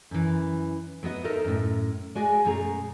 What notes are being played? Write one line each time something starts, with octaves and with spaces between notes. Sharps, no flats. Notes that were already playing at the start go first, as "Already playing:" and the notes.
F#2 E3
F#3 B3 F#4 D#5
D#4 A4 A#4 C5 D#5 E5
F#2 A2
G#3 F#4 G#4 D5 D#5 G#5
F#2 B2 A3 G#4 A#5